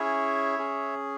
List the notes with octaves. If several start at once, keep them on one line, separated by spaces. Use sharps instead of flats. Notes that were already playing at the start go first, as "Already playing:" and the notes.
Already playing: C#4 E4 G#4 C#5 E5
C#4 G#4